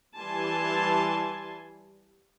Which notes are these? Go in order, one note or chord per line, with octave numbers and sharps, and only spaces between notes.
E3 G3 G#5 A5 C6